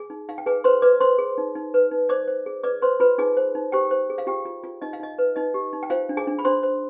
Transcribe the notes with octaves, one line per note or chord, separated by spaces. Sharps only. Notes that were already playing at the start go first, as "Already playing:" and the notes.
Already playing: G#4 G#5
D#4
D#4 F5
G5
G#4 B4 G#5
B4 C5 C6
B4 D5 D6
C5 C6
G#4
D#4
D#4
B4
D#4
C5 D5 D6
C5
G#4
B4 D5 D6
B4 C5 C6
F4 B4 B5
D#4 G#4 G#5
C5
D#4
G4 C5 G5
C5
G#4
F5
F4 G4 G5
F4
F4
D#4 D#5
F5
D#4 D#5
B4
D#4 D#5
G4
D#4
G5
F4 C5 F5
D4
G#4 G#5
D4
B5
D4 C5 C6
C5